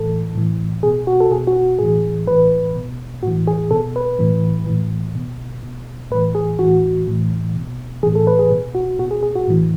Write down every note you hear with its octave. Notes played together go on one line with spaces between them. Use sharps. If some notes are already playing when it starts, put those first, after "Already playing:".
Already playing: A2 E3 A4
A2 E3
B2 G#4
F#4
A4
B2 G#4
F#4
A2 E3 G#4
A2 E3 B4
B2
A2 E3 F#4
G#4
B2 A4
B4
A2 E3
A2 E3
B2
B2
A2 E3 B4
G#4
A2 E3 F#4
A2 E3
B2
A2 E3 G#4
A4
B4
G#4
B2
F#4
B2 F#4
G#4
G#4
F#4
A2 E3